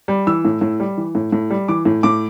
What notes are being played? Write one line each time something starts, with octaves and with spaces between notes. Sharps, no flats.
G3
E3 E6
A2
A2
G3
E3
A2
A2
G3
E3 D6
A2
A2 D6